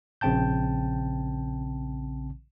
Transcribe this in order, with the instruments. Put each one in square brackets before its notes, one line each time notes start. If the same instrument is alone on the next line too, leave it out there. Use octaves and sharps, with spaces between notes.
[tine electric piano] A#1 C#3 C4 G5 A5 G6